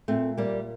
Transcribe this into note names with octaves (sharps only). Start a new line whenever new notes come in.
A#2 A3 C4
G3 A#3